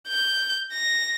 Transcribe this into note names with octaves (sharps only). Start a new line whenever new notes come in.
G6
A#6